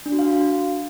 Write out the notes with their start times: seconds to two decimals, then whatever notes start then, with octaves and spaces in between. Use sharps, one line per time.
0.06 D4
0.12 F#4
0.19 F5
0.25 F#4